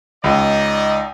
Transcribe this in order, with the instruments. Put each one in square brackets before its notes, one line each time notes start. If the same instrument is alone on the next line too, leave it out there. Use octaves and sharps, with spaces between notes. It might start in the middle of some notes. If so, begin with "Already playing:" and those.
[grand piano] C#2 [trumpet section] D#4 D5 D#5